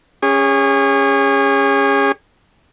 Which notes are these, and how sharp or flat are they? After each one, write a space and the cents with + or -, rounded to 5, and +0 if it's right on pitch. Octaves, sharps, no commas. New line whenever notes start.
C#4 +0 G#4 -30